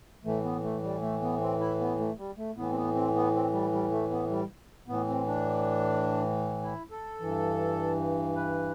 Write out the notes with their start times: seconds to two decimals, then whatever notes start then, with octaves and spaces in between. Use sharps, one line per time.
0.25 A2 E3 A3
0.44 B3
0.63 A3
0.83 G3
1.01 A3
1.22 B3
1.41 C4
1.60 E4
1.80 B3
1.99 A3
2.18 G3
2.38 A3
2.56 A2 E3 B3
2.71 C4
2.76 B3
2.95 C4
3.15 B3
3.34 C4
3.53 G3
3.72 G3
3.91 A3
4.11 B3
4.30 G3
4.88 A2 E3 B3
5.08 C4
5.27 D4
6.63 E4
6.91 A4
7.20 G2 E3
8.36 B4